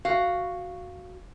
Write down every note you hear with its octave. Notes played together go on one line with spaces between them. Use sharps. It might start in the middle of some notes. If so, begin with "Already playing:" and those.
F#4 F5